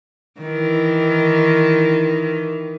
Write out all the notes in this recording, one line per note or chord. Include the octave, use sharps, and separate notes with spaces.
D#3 E3